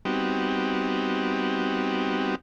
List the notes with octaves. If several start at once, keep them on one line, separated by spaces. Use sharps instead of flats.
G3 B3 C4 D#4 F#4 G4